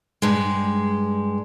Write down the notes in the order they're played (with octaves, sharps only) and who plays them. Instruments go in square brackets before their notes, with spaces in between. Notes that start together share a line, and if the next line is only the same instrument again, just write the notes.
[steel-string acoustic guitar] G2 G#3